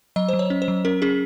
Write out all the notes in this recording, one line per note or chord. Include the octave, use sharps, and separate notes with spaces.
F#3 D#5
F#3 C5
C#5
C#4
C5
F#3
C#4 A#4
C#4 G#4